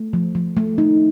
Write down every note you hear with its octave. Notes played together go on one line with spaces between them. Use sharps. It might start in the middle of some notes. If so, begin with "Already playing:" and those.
Already playing: A3
F3
F3
A3
D#4